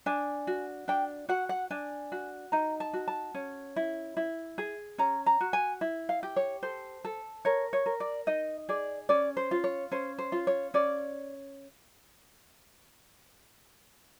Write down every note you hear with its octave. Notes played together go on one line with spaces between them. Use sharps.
D4 G#5
F#4
D4 G5
F#4 F#5
F#5
D4 G#5
F#4
D#4 A#5
A5
F#4
A5
C#4
E4
E4
G#4
C#4 A#5
A#5
F#4
G#5
E4
F5
G4
C#5
A4 C5
A4
A#4 C#5
C#5
A#4
D5
D#4 D#5
G#4 D5
C#4 D5
C5
F4
C#5
C#4 C5
C5
F4
C#5
C#4 D5